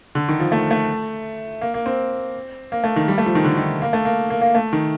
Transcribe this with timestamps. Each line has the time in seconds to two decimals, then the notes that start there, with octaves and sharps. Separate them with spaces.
0.15 D3
0.29 D#3
0.40 F3
0.52 A3
0.71 A3
1.61 A#3
1.74 A#3
1.86 C4
2.72 A#3
2.84 A3
2.96 D#3
3.08 G3
3.18 A3
3.26 F3
3.35 D#3
3.44 D3
3.57 D#3
3.82 A#3
3.93 A3
4.05 A#3
4.30 A#3
4.41 A#3
4.55 A3
4.73 D#3